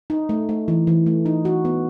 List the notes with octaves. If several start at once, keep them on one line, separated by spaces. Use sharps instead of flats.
D#4
A3
A3
E3
E3
A3
D#4
F#4
B3